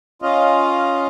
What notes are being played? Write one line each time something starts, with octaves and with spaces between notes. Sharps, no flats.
C#4 F4 D#5 F5